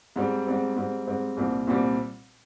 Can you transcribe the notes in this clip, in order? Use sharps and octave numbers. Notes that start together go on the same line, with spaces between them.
G#2 G3 C4
G#2 G3 C4
G#2 G3 C4
G#2 G3 C4
C2 A#2 G3 C4
C2 A#2 G3 C4